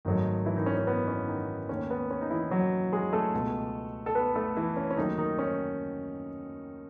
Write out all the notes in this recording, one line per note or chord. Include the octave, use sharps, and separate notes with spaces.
G#1 G#2 D#3 F#3 A3 D#4
E3 E4
D#3 D#4
C#4
C#4
B3
C#4
D#3 D#4
D#2 D#3 A3 C#4
B3
C#4
D#4
E3 E4
F#3 F#4
G#3 G#4
A3 A4
C#2 B2 G#3
A4
B3 B4
A3 A4
E3 E4
C#4
C#4
D#2 D#3 F#3 A3 D#4
D#3 D#4
C#4